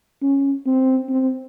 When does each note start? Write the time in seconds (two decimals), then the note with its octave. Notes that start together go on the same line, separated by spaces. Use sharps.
0.22 C#4
0.66 C4
1.09 C4